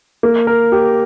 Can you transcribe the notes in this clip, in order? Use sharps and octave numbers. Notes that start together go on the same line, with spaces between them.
A#3
A#4
G4